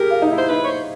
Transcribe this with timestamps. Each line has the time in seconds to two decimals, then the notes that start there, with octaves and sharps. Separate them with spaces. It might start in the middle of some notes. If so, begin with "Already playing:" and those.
Already playing: G4 G#4 A#4
0.10 F4
0.22 D#4
0.31 E4
0.38 C5
0.49 D#4 B4
0.64 C#5
0.67 C5